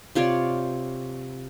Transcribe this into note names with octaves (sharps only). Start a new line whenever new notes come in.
C3 F4 C#5 D5